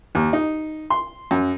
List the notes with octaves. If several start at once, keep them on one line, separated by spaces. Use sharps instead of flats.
D#2
D#4
C6
F#2